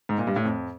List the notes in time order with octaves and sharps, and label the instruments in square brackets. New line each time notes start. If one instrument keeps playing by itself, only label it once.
[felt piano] G#2
A#2
G2
A2
F2